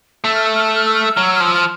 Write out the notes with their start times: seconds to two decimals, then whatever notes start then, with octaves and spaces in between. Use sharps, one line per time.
0.24 A3 E6
0.35 F6
0.45 E6
0.55 F6
0.65 E6
0.75 F6
0.85 E6
0.95 F6
1.05 E6
1.15 F#3 F6
1.25 E6
1.35 F6
1.40 F3 E6
1.54 F6